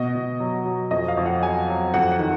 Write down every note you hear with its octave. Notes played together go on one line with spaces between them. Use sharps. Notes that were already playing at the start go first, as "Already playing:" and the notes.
Already playing: B2 D#5
B2
F#3
F#3
F2 D#5
F5
F2
F#5
F#3 G#5
F#3
F2 F#5
F#5
D#3